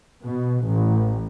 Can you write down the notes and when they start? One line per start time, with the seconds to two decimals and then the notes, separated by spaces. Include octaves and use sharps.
0.22 B2
0.66 A1